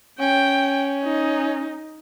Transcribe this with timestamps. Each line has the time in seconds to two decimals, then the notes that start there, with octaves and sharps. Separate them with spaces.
0.20 C#4 G5
1.04 D#4